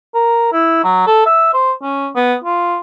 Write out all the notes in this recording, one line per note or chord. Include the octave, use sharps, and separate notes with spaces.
A#4
E4
F#3
A4
E5
C5
C#4
B3
F4